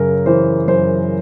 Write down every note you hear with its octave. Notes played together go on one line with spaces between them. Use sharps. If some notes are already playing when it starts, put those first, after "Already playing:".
Already playing: F#2 C#3 A#4
E3 C5
F#2 C5